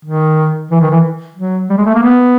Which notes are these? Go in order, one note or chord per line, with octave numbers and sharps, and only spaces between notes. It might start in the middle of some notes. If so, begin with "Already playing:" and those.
D#3
E3
D#3
E3
F#3
G3
G#3
A3
A#3
B3